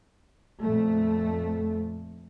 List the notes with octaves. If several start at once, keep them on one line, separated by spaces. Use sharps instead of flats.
F2 A#2 A3